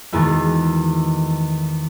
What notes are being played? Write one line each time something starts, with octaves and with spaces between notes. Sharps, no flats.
E2 B2 D#3 E3 G#3 A3